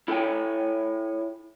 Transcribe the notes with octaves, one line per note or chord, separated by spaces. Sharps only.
E4 A4 C#5 G5 G#5